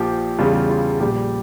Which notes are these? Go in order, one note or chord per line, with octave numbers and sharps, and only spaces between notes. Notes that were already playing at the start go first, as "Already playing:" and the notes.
Already playing: A#1 A#2 F3 G4
E2 C#3 G3 F4
F4
A#1 A#2 G3 G4